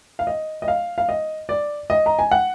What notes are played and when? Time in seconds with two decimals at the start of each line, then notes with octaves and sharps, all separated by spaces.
0.19 F5
0.27 D#5
0.62 D#5
0.68 F5
0.98 F5
1.09 D#5
1.49 D5
1.90 D#5
2.06 A#5
2.19 G#5
2.31 F#5